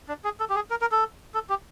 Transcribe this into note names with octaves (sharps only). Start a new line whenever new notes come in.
D4
G#4
A4
G4
G#4
A#4
A#4
A4
A4
G4